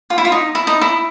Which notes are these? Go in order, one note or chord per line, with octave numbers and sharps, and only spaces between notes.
F4
E4
F4
D#4
E4
D#4
E4